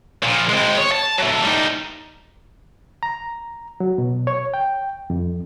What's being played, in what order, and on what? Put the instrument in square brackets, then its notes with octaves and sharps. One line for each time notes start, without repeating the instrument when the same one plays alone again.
[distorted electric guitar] A#2 F3
G#3 C4
C#5
A5
F#3 A3
G3 D#4
[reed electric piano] A#5
F#3
B2
C#5
G5
F2